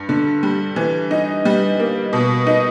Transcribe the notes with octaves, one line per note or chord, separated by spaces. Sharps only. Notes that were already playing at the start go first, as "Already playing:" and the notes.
Already playing: G2
D3
G3
E3
D#4
G3
A#3
B2
D#4